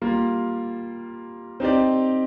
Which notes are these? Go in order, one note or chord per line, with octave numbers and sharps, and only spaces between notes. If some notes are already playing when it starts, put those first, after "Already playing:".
G3 A#3 F4
C4 D#4 G4 D5